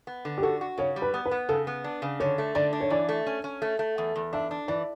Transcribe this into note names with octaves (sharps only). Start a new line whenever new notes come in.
B3
D3
G4
F#4 A4
F#4
C#3 C#5
G3
B4
B3
B4
B3
C#3 A4
B3
D4
C#3
D3 C#5
A3
D3 D5
D4
C#5
E3 D5
A3
C#4
C#4
A3
A3
E2
E2
D4 E5
D4
E3 D5